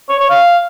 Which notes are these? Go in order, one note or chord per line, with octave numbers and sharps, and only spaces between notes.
C#5
C#5
F5